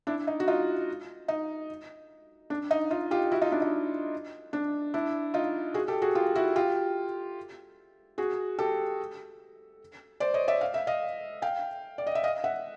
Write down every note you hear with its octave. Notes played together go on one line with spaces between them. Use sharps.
D4 E4
D#4
F#4
D#4 F4
D#4
D4
D#4
D#4 F4
F4 G4
E4 F#4
D#4 F4
D4 E4
D#4
D4
D4 E4
D#4 F4
F#4 G#4
G4 A4
F#4 G#4
F4 G4
E4 F#4
F4 G4
F#4 G#4
G4 A4
C5 D5
C#5 D#5
D5 E5
F5
E5
D#5 F5
F5 G5
D5
D#5
E5
D#5 F5
E5 F#5